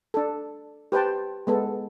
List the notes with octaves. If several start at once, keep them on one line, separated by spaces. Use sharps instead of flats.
D4 A4
G4 B4 C5 G5 A5
G#3 B3 A4